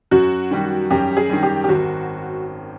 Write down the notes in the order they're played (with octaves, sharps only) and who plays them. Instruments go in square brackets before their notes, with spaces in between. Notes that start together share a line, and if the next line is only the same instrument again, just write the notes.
[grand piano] F#2 [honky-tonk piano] F#4
[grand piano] D#3 G3
[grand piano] F#2 [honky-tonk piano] G4
[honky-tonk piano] G#4
[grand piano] D#3 G3
[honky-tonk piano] G4
G4
[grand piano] G#1 [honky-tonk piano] F#4